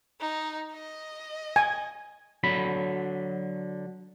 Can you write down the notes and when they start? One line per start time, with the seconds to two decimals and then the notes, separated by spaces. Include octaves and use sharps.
0.21 D#4
0.73 D#5
1.56 G#5
2.44 D3 F#3 B5